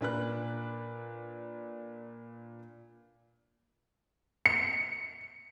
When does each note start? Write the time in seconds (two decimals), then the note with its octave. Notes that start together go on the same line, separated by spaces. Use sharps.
0.01 A#2 D4 B4 F#6
4.46 C#7